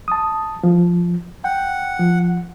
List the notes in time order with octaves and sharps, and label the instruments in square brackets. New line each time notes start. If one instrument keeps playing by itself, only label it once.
[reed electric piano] A5 D#6
F3
[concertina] F#5 [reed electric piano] G5
[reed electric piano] F3